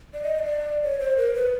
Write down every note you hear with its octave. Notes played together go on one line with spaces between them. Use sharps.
D5
D#5
D#5
D5
C#5
C5
A#4
B4